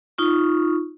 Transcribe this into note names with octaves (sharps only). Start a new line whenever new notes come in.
D#4 F4 C#6